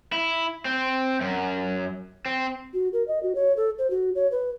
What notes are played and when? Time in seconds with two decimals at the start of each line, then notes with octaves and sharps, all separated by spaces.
0.13 E4
0.65 C4
1.21 F#2
2.26 C4
2.73 F#4
2.93 A#4
3.07 D#5
3.23 F#4
3.35 C#5
3.56 A4
3.78 C5
3.90 F#4
4.15 C#5
4.31 B4